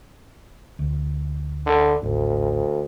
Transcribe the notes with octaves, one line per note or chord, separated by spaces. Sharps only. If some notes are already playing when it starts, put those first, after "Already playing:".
D2
D3
D#1 A1 D2